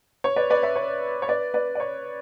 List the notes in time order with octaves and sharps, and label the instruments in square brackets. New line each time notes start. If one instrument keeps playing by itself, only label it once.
[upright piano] C#5
B4 D5
B4 D5
C#5 E5
C#5
C#5
B4 D5
B4 D5
D5
C#5